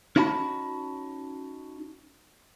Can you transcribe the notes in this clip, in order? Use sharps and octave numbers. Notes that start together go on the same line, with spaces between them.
C#4 D#4 E4 F#4 A5 B5